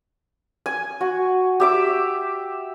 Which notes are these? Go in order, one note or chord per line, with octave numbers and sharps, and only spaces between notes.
G#5
F#4
G4 E5 D6